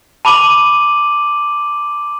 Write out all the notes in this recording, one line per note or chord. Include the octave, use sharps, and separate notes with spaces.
A5 B5 D6 D#7 F#7